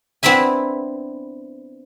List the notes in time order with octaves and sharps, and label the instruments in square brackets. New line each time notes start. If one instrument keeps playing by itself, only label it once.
[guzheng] B3 C4 D4 E4 E5 G#5